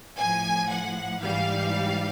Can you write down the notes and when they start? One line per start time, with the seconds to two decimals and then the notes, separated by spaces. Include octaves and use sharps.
0.18 A2 F3 G#5
0.70 F#5
1.21 G#2 E3 G3 F5